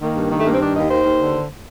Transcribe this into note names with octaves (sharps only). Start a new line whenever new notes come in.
D#3 A#3
G2
D#3
A3
G2 A#3
C4
D#3 D4
D#2 D#4
D#3 C5
D#2
D3